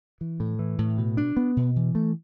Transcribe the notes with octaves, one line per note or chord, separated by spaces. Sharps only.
E3
A2
E3
A2
B2
D4
B3
B2
E3
A3